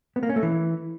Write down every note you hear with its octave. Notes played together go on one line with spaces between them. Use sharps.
B3
A#3
C#4
A3
E3